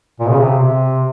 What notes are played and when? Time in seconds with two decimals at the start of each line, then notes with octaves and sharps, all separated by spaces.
0.20 A#2
0.30 C#3
0.39 C3
0.60 C3